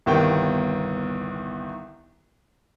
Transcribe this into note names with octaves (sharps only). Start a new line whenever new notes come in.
G1 C2 D#3 B3 G5